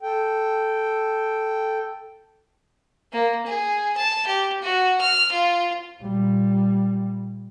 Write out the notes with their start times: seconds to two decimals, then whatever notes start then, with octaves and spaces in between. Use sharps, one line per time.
0.03 A4 G5
3.12 A#3
3.46 G#4
3.97 A5
4.26 G4
4.62 F#4
5.00 F6
5.31 F4
6.02 A#2 G3